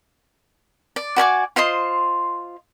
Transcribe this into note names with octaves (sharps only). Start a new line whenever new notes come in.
D5
F#4 D5 G#5 D6
F4 C5 D#5 C6